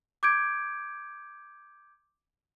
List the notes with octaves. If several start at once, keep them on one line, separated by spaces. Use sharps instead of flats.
D6 G6 G#6 D7